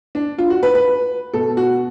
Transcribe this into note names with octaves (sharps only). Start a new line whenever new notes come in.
D4
F4
F#4
B4
B4
B2 A4
F#4